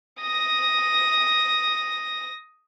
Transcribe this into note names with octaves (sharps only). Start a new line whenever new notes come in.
D#6 A#6